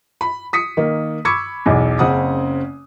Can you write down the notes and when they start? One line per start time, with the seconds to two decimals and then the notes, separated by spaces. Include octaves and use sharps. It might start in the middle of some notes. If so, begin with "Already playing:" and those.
0.21 B5
0.53 D#6 B6 C#7
0.77 D#3 A#3
1.25 B5 C#6 D6 E6 G#6 C#7
1.66 B1 E2
1.99 F#1 C#3 C4 F#5 D#6